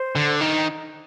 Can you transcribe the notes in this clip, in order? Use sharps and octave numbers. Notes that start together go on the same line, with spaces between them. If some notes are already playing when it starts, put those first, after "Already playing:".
Already playing: C5
D3
D#3